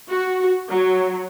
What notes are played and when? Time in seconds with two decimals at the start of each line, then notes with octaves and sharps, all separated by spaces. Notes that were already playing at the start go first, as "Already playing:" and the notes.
0.10 F#4
0.69 F#3